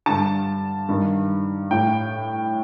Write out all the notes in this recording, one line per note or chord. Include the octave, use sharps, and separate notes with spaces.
G2 D3 A5
G2 D#3
A2 G5